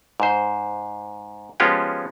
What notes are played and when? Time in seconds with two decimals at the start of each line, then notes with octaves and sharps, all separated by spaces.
0.20 G#2 C5
1.60 F3 G#3 B3 C#4 F4 G4